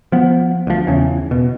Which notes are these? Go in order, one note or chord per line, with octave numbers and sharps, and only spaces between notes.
F3 B3
D2 F3
E2 C#3 E3
B2